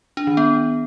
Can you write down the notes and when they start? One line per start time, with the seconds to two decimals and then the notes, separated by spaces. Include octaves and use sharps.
0.17 D4
0.27 D#3
0.37 B3